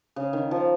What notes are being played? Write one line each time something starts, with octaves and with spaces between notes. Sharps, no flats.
C#3
D#3
F3